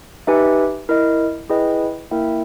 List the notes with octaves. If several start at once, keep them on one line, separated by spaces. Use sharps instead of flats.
D#4 G4 B4 E5 G#5
E4 A#4 D#5
E4 G#4 B4 D#5 G5
A#3 E4 A#4 E5 G5